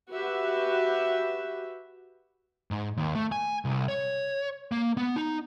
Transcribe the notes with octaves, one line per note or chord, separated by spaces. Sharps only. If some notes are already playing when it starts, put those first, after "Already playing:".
F#4 G4 B4 E5
G#2
D#2
A3
G#5
C2
C#5
A#3
B3
D#4